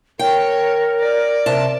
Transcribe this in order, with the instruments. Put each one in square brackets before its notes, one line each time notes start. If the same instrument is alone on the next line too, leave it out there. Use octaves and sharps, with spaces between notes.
[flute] A#4 [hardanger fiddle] C#5 [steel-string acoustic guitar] G5
[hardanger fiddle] D5
[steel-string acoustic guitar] C3 A5